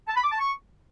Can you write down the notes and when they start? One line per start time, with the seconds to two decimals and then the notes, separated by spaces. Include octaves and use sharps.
0.08 A5
0.16 B5
0.24 D6
0.32 A5
0.40 C#6